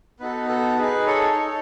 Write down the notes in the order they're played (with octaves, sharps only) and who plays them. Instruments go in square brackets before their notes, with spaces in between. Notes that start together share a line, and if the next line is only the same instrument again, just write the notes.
[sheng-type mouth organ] B3 D#4 F#4 A4 B4
A4
D#4 G#4 B4
A4 C#5
D#4 A4